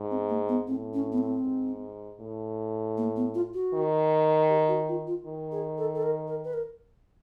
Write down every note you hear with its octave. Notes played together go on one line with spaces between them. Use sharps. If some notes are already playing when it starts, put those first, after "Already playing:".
Already playing: G#2
C4
A#3
B3
A2 C4
C#4
B3
C4
G#2
A2
A#3
B3
F4
F#4
D#3
G4
F#4
F4
F4
D#3
G#4
A4
A4
A#4
A#4
B4
A#4